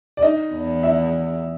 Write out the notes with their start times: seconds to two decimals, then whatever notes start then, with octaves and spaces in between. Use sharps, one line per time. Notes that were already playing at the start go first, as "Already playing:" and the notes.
0.17 D5
0.22 D#4 D#5
0.53 E2
0.83 E4 E5